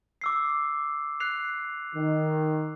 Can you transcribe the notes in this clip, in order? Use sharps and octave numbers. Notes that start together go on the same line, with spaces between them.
D6 E6 C7
F#6 C7 F7
D#3